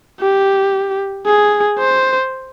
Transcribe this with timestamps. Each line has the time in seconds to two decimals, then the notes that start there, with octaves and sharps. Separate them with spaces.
0.20 G4
1.27 G#4
1.79 C5